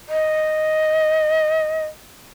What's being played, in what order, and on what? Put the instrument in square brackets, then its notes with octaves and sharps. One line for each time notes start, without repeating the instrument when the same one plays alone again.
[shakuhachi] D#5